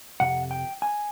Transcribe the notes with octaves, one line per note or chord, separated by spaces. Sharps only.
F2 C3 F#5
G5
G#5